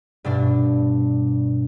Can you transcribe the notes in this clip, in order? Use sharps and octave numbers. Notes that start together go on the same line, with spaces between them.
G2 B2 D4